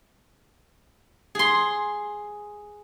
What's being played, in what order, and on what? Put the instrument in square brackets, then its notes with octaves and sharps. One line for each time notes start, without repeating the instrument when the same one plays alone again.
[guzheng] G#4 C6